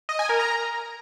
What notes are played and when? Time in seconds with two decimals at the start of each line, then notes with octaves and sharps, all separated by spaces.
0.09 D#5
0.19 G#5
0.29 A#4
0.40 A#5